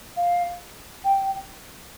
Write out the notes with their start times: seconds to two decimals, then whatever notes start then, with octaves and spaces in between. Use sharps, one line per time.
0.16 F5
1.04 G5